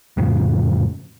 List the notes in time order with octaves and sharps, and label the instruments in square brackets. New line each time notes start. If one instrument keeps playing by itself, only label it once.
[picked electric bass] F2 A2 C#3 F3